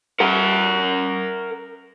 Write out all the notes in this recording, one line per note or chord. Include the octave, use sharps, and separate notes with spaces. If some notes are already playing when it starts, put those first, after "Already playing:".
A#4 F#5